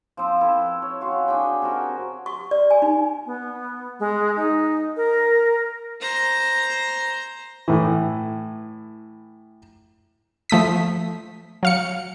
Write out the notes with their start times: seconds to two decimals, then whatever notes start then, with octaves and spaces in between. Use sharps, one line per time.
0.17 F3 C4
0.41 E4 A4 B4
0.82 C#5
1.01 C#4 F4 F#4
1.27 D4 G#4 G5 B5
1.62 C3 F#4 A#4
2.26 C#6
2.51 D5
2.71 G#5
2.82 D#4
3.26 B3
4.00 G#3
4.36 D#4
4.97 A#4
6.01 C5 A#5
7.68 A2 E3
10.50 F3 A3 D#6 B6
11.63 F#3 F5 C#7